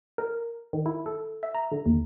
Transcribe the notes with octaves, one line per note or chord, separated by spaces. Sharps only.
A#4
D#3
E4
A4
E5
A#5
D3
D#2